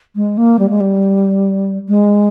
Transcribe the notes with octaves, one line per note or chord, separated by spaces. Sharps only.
G#3
A#3
G3
G#3
G3
G#3